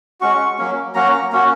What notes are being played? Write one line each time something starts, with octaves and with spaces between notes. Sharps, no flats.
G#3 C#4 F#4 C#6
F#3 A#3 C#4
F#3 A#3 C#4 F#4 A#5
A#3 C#4 F#4